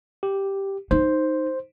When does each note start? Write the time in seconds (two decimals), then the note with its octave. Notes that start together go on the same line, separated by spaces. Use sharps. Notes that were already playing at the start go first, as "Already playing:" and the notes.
0.23 G4
0.91 D#4 C5